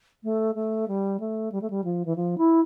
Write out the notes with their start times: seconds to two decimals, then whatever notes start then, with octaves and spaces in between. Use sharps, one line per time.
0.24 A3
0.55 A3
0.88 G3
1.20 A3
1.52 G3
1.62 A3
1.70 G3
1.84 F3
2.05 E3
2.16 F3
2.38 E4